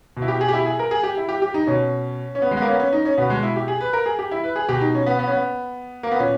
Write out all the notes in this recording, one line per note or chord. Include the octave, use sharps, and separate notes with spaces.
B2
E4
G4
G#4
G4
E4
G#4
A#4
G#4
G4
E4
G4
G4
D#4
B2 C#4
C#4
B3
G#3
B3
A#3
C#4
B3
C#4
D#4
C#4
B2 B3
G#3
E4
G4
G#4
B4
A#4
G#4
G4
E4
B4
G#4
B2 G4
D#4
C#4
B3
B3
C#4
B3
A#3
B3
A#2 C#4